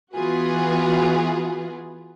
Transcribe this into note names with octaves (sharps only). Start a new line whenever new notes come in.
E3 B3 F4 F#4 G#4 B4